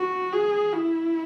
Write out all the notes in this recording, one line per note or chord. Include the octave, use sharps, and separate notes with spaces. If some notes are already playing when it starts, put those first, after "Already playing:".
Already playing: F#4
G#4
E4